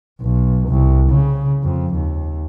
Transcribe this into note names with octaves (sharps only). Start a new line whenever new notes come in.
B1
C2
C#3
F2
D#2